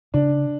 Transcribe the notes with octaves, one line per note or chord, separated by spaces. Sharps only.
C#3 D4